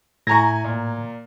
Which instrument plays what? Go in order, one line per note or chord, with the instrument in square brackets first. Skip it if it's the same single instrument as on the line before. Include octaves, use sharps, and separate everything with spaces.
[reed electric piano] A2 G#6 [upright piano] E4 G#5 C#6 [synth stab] A#5 A#6
[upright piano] A#2